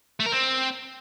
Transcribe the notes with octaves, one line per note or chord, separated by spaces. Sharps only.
A3
A#4
C4